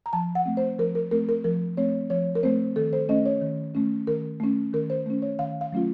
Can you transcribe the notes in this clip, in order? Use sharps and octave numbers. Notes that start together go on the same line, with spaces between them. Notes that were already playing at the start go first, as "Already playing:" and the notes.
A#5
F3 A5
F#5
A3 C4
C5
F3 A#4
A#4
A3 C4 A#4
A#4
F3 A#4
A3 C4 C#5
F3 C#5
A#4
A3 C4 C5
D#3 A4
C5
A3 C#4 D#5
C#5
D#3
A3 C#4
D#3 A#4
A3 C#4
D#3 A#4
C5
A3 C#4
C#5
D#3 F5
F5
F#3 A3 C#4 F4